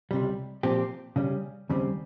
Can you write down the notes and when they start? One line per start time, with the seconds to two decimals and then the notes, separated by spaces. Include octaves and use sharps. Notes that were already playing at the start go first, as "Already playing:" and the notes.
0.11 C#2 C3 G3
0.63 A#2 F3 C4 G4
1.16 C#3 G3 C#4
1.69 D#2 C#3 G3 C4